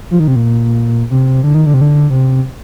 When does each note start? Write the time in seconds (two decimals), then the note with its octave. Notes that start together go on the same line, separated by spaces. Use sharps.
0.11 F3
0.20 D#3
0.28 C3
0.36 A#2
1.11 C3
1.44 D3
1.54 D#3
1.66 D3
1.74 C3
1.81 D3
2.10 C3